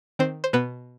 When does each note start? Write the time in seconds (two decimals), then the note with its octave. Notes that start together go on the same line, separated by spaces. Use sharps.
0.19 D#3 C4 C5
0.44 C5
0.53 B2 B3 B4